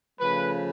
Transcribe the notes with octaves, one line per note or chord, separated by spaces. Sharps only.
C#3 F3 A3 B4